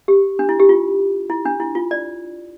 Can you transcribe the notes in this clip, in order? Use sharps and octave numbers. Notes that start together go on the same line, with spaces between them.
G4
D4
E4
G4
F4
E4
D4
E4
F4
D5